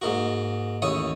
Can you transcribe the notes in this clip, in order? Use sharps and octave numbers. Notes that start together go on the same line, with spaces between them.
G#2 A#3 F#4
A1 D#2 C#5 D#6